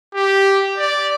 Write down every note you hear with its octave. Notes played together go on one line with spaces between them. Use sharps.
G4
D5